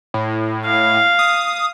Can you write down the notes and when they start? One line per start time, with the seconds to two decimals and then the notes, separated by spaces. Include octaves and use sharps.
0.14 A2
0.65 F5
1.19 D#6